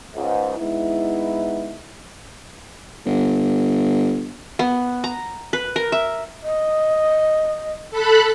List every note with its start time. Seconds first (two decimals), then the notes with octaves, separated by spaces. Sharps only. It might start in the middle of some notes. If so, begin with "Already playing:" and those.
0.16 C#2 G#2
0.58 G#3 B3 D#4 E4
3.06 G1
4.59 B3
5.04 A#5
5.53 B4
5.76 A#4
5.92 E5
6.43 D#5
7.91 A4 B5 F#6